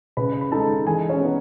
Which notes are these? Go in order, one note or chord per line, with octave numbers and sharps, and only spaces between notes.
C#3 B4 B5
B5
G#3 D#4 A4 A5
E3 G#4 G#5
C#4 C#5
B3 D#4